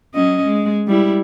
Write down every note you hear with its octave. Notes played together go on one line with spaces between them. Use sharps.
F#3 C#4 D#5
G#3
G3 E4